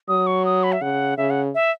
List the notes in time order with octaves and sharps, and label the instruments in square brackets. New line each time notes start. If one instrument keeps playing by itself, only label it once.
[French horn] F#3 [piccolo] D#6
[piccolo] C#6
D#6
B5
E5
[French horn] C#3 [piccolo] F#5
[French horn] C#3 [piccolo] E5
[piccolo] F#5
E5